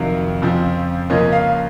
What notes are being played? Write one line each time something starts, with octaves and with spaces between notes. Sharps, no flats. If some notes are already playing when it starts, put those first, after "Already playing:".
Already playing: F2 C3 D#3 F#3 F5
F2 C#3 F3 C4
C#2 C#3 F3 A#3 C#4 D#5
F5